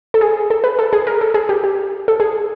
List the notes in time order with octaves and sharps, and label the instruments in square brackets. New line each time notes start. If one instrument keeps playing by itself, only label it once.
[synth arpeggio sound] A4
G#4
A4
B4
A4
G#4
A#4
A4
G#4
G4
G4
A4
G#4